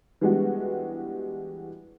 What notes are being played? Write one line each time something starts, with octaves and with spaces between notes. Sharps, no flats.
E3 G3 G#3 B3 D4 F#4